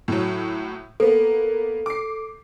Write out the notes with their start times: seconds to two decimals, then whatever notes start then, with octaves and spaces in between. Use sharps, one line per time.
0.08 A2 F#3
1.00 A#3 B3 A4
1.86 D6 C7